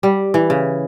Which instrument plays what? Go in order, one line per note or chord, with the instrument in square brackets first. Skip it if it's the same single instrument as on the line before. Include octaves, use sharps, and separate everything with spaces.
[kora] G3
E3
C#3